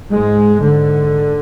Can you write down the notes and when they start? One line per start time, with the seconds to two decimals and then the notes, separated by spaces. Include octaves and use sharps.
0.11 G#2 G#3
0.62 G#2 D3